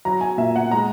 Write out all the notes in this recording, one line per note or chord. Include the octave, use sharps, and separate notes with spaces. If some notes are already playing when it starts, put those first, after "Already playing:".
F#3 A#5
G#5
A#2 E5
F#5
G#3 A#5